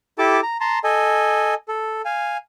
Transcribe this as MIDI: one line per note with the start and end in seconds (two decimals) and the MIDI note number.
0.18 0.41 64
0.18 0.41 67
0.18 0.41 69
0.18 0.41 81
0.18 0.41 86
0.43 0.57 82
0.60 0.79 81
0.60 0.79 82
0.60 0.79 84
0.84 1.54 69
0.84 1.54 75
0.84 1.54 80
1.68 2.02 69
2.05 2.37 77
2.05 2.37 80